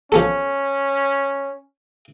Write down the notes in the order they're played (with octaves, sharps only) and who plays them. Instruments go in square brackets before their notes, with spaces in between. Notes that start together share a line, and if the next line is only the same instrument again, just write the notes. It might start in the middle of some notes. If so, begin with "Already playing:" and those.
[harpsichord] F3 B3 A4 [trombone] C#4